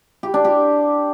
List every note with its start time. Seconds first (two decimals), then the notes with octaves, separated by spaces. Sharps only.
0.23 G4
0.34 D4
0.45 G4